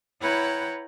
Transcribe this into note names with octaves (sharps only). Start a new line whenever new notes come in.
E4 B4 C#5 F#5 G5 A#5